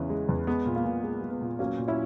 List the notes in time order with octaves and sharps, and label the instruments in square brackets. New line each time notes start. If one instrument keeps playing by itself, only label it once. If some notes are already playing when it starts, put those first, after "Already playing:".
Already playing: [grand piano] E2 C#3 E3 B3 C#4
G#3
E2
G#3 B3
A#2
A#3
A#2
G#3
G#3
B3
A#2
F#3 A#3 C#4
A#2
C#4 E4